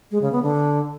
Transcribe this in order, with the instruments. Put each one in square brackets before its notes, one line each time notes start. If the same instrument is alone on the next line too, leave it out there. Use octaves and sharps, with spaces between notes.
[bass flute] G#3
C#3
B3
D3